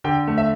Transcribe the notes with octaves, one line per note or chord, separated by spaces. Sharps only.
D3 G5
A3
E5